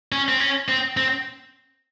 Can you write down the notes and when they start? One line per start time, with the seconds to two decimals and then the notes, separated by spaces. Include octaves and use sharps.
0.12 C#4
0.29 C4
0.40 C#4
0.69 C4
0.97 C4